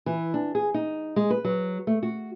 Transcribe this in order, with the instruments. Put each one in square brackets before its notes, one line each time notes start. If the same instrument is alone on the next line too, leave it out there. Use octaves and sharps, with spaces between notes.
[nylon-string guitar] E3
D4
G#4
D#4
G#3
B4
F#3
A3
F#4